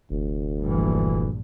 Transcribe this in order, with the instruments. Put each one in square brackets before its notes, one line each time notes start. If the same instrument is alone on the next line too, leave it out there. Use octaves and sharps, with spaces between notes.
[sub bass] F1 [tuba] D2
[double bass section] A#1 G2 [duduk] E3